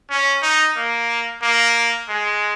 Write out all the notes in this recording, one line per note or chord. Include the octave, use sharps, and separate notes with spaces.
C#4
D#4
A#3
A#3
G#3